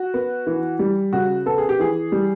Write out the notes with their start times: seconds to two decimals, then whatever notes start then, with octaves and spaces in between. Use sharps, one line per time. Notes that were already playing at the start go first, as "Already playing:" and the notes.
Already playing: F#4
0.14 B3
0.47 E3
0.79 G3
1.13 C#3 F#4
1.46 B3 A4
1.58 G#4
1.69 G4
1.79 E3 G#4
2.12 G3